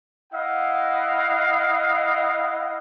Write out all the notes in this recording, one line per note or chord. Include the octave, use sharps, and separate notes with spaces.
E4 D#5 F5 F#5